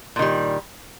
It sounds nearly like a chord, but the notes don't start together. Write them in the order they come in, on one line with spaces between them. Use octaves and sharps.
A#2 D#3 G3